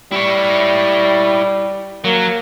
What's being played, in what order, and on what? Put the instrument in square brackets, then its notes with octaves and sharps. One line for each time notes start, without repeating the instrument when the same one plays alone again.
[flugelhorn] G3 [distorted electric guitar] E4 C#5
[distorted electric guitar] F#3 [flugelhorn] A#3